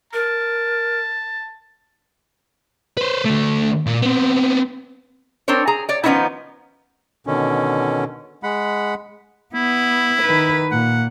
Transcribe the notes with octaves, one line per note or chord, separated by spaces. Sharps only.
A#4 A5
B4 C5
D2 A3
A#2
B3 C4
C4 D4 A#4 C5 C#5
G#4 A#5
C#5 D5
D#3 F3 B3 C#4 D#4 E4
B2 D3 D#3 C#4
G#3 F#5 B5
B3 E4
D#3 B4
A#2 F#5